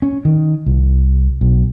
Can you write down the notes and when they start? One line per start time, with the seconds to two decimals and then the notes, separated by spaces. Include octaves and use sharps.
0.02 C#4
0.25 D#3
0.66 C2
1.41 B1